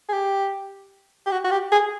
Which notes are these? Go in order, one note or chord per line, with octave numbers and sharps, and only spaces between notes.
G#4
G4
G4
F#4
F#4
G4
G#4